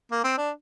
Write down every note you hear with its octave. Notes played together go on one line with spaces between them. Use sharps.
A#3
C4
D4